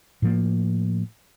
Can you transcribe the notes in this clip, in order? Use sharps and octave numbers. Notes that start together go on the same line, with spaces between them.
A2 F3 A#3